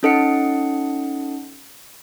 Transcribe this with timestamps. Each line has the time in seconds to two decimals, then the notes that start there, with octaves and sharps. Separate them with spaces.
0.03 C#4 D#4 A4 D#5 F#5 C#7